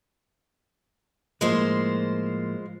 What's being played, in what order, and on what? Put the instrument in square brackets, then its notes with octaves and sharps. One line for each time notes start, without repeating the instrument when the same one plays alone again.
[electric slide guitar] A2 F3 A#3 [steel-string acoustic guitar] G#3 F4 C5